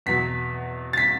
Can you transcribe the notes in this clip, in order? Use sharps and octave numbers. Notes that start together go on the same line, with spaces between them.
E2 B2 F#3 B6
A6
B6